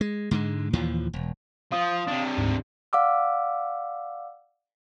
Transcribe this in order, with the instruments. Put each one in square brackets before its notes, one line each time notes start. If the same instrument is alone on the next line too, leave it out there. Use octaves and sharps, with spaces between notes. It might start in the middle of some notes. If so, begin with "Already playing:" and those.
[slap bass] G#3
G#2 D3 G#3
D#2 A#2 E3 F3
E1
[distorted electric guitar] F3 [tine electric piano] F5 D#6
[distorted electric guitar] C3 D4
[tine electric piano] D2 G#2
[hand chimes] D5 F5 F#5 D6 E6